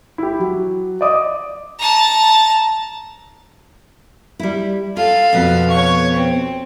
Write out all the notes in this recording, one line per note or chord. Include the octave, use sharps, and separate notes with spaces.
E4 G4
F#3
D5 D#5 D6 D#6
A5 A#5
G3 E4
F4 A4 F5
F2 B2 B3
C#5 C#6
C4